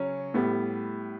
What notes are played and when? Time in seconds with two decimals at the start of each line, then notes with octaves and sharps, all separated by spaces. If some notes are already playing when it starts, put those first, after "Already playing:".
Already playing: C#3 F#3 C#4
0.34 A2 G3 B3